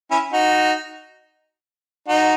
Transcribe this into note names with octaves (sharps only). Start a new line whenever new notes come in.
C#4 E4
D#4 F#4
D#4 F#4